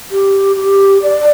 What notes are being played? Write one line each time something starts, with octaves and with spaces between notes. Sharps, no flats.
G4
G4
D5